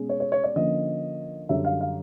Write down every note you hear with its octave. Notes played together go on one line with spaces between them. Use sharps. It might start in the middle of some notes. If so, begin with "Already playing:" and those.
Already playing: B2 G#3 C#4
C#5
C#5
C#5
D5
D3 F3 A#3 C#4 D#5
F#2 D3 G3 E5
F5
F5